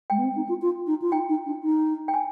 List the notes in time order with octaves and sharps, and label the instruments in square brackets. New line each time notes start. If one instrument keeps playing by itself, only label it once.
[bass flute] G#3 [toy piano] G5
[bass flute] B3
C4
D#4
F4
F4
D#4
F4
[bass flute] D#4 [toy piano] G5
[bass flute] D#4
D4
D#4
[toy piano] G5
G#5